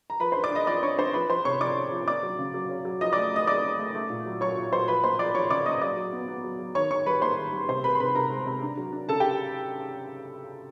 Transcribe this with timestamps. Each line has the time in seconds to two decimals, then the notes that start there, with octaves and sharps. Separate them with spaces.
0.10 A#5
0.20 F3 B4 B5
0.32 D4 C5 C6
0.44 D5 D6
0.51 D4 D#5 D#6
0.67 F3 D5 D6
0.82 D4 C#5 C#6
0.98 D4 C5 C6
1.14 F3 B4 B5
1.30 F3 C5 C6
1.45 C3 C#5 C#6
1.61 F3 D5 D6
1.76 C#4
1.92 F3
2.08 A#3 D5 D6
2.23 F#3
2.39 C#3
2.54 F#3
2.69 C#4
2.85 F#3
3.01 F3 D#5 D#6
3.13 A3 D5 D6
3.32 A3 D#5 D#6
3.47 A3 D5 D6
3.63 C#4
3.79 A3
3.95 A3
4.10 A#2
4.26 F#3
4.41 F#3 C#5 C#6
4.57 A#2
4.72 F#3 C5 C6
4.88 F3 B4 B5
5.04 A#3 C5 C6
5.19 F3 D5 D6
5.35 F3 C#5 C#6
5.50 C#3 D5 D6
5.66 A#3 D#5 D#6
5.81 F#3 D5 D6
5.97 F#3
6.13 B3
6.28 B3
6.44 F#3
6.59 F#3
6.75 D#3 C#5 C#6
6.91 D#3 C#5 C#6
7.06 G3 B4 B5
7.22 A#3 C5 C6
7.37 D#3
7.53 G3
7.69 C3 C5 C6
7.84 C3 B4 B5
7.95 C6
8.00 C3 B4 B5
8.15 C3 A#4 A#5
8.31 G#3
8.47 C3
8.62 D4
8.78 F#3
8.93 D4
9.09 C#3 A4 A5
9.20 G4 G5